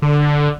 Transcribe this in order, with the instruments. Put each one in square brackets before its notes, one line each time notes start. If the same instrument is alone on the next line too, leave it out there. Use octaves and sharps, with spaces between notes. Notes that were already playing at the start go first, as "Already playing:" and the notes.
[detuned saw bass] D3